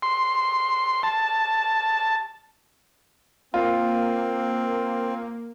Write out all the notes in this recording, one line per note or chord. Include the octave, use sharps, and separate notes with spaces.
C6
A5
A#3 C4 F4